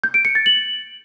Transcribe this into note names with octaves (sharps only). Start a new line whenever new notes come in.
G6
D7
C#7
A6
F#7